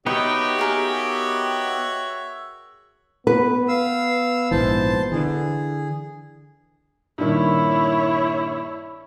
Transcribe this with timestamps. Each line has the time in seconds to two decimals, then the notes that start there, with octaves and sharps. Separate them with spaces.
0.06 B3 D#4 F#4 G4 B4 C#5 E5
0.59 G#4 A#4 G5
3.27 B3 B4
3.68 F5 E6
4.51 A#1 G#2 E3 C5 A5
5.12 D3 E3 G#4
7.18 G2 A#2 D#3 E4 C#5